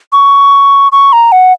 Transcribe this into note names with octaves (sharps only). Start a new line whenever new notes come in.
C#6
C#6
A#5
F#5